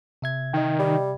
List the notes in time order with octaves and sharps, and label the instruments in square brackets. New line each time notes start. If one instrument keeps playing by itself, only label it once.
[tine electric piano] C3 E5 G#6
[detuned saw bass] D#3 [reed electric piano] D#5 G5
[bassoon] G3